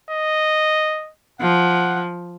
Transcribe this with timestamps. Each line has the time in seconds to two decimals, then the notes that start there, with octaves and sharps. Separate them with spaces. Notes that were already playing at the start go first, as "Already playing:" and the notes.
0.11 D#5
1.41 F3 F#5